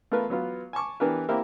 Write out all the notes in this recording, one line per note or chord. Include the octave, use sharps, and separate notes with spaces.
A3 B3 F4 A#4 B4
F#3 B3 F4
G#5 A5 C#6 D6
E3 B3 D4 G4 A#4 B4
A#3 C4 E4 G4 A#4